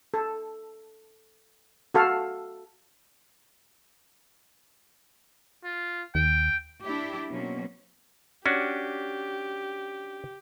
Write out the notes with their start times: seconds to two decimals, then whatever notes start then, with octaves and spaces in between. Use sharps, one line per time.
0.14 A4
1.94 F#4 A4 F5
5.64 F4
6.15 D#2 G5
6.83 D4 E4 G4
7.28 B2 F#3 A#3 C4 C#4
8.46 C#4 D4 F#4 G4